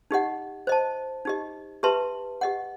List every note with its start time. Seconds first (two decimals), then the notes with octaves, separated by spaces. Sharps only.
0.11 D#4 G4 D#5 F#5
0.67 C5 D#5 A5
1.25 D#4 G4 D#5
1.83 G4 B4 E5 A5 C6
2.41 G4 D#5 F#5